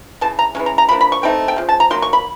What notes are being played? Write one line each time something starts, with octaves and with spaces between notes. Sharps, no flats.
C#3 E3 A5
A#5
E3 G#3 C#4
A#5
A#5
F3 A#3 D4 B5
B5
C#6
E3 A3 C4 D#4 G5
G5
C#3 F3
A5
A#5
D#3 F#3 A#3 C6
C#6
B5